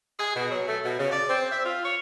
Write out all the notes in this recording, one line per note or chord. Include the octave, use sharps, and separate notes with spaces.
G#4
B2
F#3
A3
B2
C#3
D5
C4
E5
F4
C#5